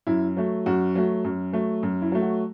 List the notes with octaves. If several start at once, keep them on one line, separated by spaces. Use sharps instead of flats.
F#2 E4
F#3 A3
F#2 F#4
F#3 A3
F#2
F#3 A3
F#2
E4
F#3 A3
F#4